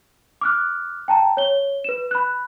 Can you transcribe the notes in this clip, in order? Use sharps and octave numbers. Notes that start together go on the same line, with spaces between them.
D6 F6 F#6
G5 A5 A#5
C#5 G7
B4 E7
B5 F#6